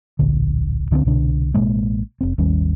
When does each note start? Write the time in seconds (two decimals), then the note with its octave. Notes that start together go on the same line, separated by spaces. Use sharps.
0.19 D1 A#1 D3
0.91 C#2 D3 B3 C4
1.05 C2 B2 D3 D4
1.54 A1 B2 G#3 A#3
2.21 F1 C4
2.38 G#1 D#2 G3 C#4